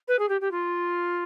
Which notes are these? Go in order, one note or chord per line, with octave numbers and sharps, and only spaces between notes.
B4
G#4
G4
G4
F4